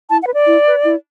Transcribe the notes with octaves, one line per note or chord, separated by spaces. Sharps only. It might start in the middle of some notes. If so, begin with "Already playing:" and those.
E4 A5
F#5
B4
D5
E4
B4
E4